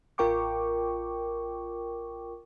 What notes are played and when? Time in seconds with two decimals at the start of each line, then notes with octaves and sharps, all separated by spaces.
0.18 A1 F4 A#4 G5 C#6 D6